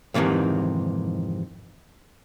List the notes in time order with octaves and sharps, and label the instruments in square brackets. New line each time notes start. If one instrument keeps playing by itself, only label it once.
[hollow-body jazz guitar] F2 G#2 C3 D#3 E3